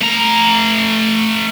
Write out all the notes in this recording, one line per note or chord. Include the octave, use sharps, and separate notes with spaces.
A3 A#5